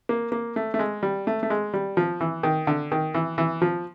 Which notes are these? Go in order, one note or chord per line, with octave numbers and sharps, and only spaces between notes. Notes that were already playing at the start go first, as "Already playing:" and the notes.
A#3
A#3
A3
A3
G#3
G3
A3
A3
G#3
G3
F3
E3
D#3
D3
D#3
E3
E3
F3